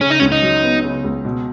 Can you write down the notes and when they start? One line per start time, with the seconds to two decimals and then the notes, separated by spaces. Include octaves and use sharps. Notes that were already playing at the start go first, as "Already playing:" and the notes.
0.01 C#3 C#4
0.11 D#4
0.20 C#2 C#4
0.32 D#4
0.42 F#3
0.63 B3
0.84 C#3
1.04 C#2
1.25 B2